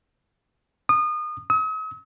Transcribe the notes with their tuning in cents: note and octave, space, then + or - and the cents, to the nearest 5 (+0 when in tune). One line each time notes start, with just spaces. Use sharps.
D#6 -30
D#6 +45